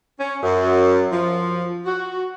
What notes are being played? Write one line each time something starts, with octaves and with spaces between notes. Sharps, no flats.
C#4
F#2
F3
F#4